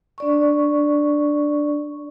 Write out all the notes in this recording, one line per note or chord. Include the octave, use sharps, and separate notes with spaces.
D4 D5 C#6